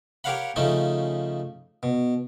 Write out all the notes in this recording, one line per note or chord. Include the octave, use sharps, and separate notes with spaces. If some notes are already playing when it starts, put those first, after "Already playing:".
G4 A#4 C#5 F5 F#5 B5
C#3 F3 A3 C#4 D#4
B2